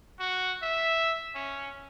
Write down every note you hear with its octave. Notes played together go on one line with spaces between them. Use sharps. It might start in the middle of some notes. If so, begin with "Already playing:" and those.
F#4
E5
C#4